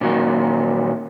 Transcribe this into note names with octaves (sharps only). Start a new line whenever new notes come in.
A#2 D#3 F#3 A#3